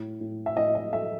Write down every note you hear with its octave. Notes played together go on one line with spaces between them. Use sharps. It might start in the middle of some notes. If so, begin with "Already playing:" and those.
Already playing: A2
A2
E5
A2 D#5
D#5
A3 E5